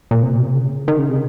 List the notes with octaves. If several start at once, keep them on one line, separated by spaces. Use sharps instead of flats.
A#2
C3
A#2
C3
C#3
D#3
C#3
C3